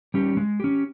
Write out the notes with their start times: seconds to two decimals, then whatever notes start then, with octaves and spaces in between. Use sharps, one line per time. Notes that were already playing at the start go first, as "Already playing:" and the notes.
0.14 G3 C#4 G4
0.37 G#3
0.60 C#4 G4